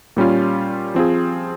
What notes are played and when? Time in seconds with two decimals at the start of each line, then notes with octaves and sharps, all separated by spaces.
0.17 A#2 G3 C#4 F4
0.95 F3 C4 F4 G#4